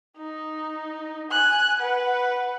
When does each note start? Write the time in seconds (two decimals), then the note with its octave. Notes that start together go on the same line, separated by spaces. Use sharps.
0.18 D#4
1.31 G#5 F#6
1.79 B4 F#5